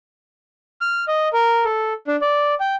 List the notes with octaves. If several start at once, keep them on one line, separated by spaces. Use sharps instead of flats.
F6
D#5
A#4
A4
D4
D5
G5